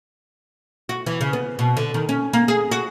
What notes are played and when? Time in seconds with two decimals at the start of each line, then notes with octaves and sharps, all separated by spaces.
0.89 F#4
1.06 E3
1.21 C#3
1.33 B3
1.59 B2
1.77 D3
1.94 D#3
2.09 C#4
2.33 A#3
2.48 G#4
2.71 F#4